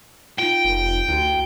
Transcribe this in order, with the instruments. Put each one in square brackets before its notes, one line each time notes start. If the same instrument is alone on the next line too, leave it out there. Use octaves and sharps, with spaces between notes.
[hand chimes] D#4 F4 [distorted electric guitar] G5
[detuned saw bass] F1
[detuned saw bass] D2 [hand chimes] E4 F#4